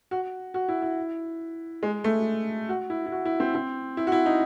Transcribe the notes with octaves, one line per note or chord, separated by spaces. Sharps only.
F#4
F#4
E4
E4
G#3
A3
F#4
E4
E4
F#4
E4
C4
C4
E4
F#4
E4
D#4